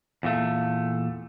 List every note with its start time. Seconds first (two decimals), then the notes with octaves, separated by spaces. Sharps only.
0.23 E2 A#2 A3